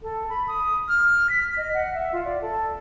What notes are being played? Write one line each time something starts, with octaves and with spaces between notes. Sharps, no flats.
A4
B5
D#6
F6
B6
D#5
F#5
E5
F4
D5
A4